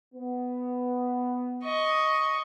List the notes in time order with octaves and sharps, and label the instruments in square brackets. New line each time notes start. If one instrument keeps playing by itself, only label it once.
[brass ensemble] B3
[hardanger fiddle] D#5 C#6